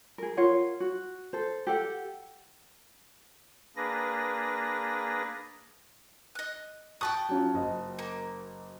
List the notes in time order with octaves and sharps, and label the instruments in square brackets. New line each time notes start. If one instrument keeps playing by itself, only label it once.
[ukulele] G#4 A#4
F4 A#4 C#5 F#5
F#4
A4 C5
G4 A4 F#5
[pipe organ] A#3 D4 G#4 B4 A#6
[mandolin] D#5 F#6
[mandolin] G5 A5 D#6 [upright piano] C#6 F#6
[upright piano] F#3 C#4 F4
F#1 D#5
[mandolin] A#3